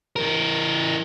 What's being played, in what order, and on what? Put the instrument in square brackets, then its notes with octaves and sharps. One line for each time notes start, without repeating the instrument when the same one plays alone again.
[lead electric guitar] E3 A#4